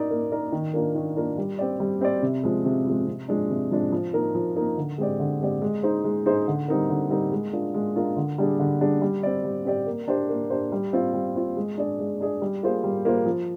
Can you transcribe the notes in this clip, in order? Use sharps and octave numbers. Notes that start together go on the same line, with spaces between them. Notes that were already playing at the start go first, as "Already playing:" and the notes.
Already playing: D#4 A#4 D5
A#3
D#4 A#4 D5
D#3
A#3 D4 F4 A#4
D#3
A#3 D4 F4 A#4
G3
C4 G4 D5
G3
C4 G4 D5
C3
F3 G#3
C3
F3 G#3
C3
F3 G#3 D4
C3
F3 G#3 D4
F3
A#3 D#4 A#4
F3
A#3 D#4 A#4
D3
G#3 C4 G4 D5
D3
G#3 C4 G4 D5
G#3
D#4 G#4 C5
G#3
D#4 G#4 C5
D3
G3 C4 D#4 A#4
D3
G3 C4 D#4 A#4
G#3
D4 F4 A#4
G#3
D4 F4 A#4
D3
G3 D4 G#4
D3
G3 D4 G#4
G3
C4 G4 D5
G3
C4 G4 D5
A#3
D4 G4 C5
A#3
D4 G4 C5
G3
C4 F4
G3
C4 F4
G#3
D4 G#4 D5
G#3
D4 G#4 D5
G3
A#3 F4 G#4 C5
G3
A#3 F4 G#4 C5
F3